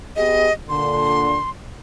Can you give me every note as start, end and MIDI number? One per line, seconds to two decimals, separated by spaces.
0.16 0.48 59
0.16 0.48 67
0.16 0.48 68
0.16 0.52 75
0.69 1.39 46
0.69 1.39 50
0.69 1.50 84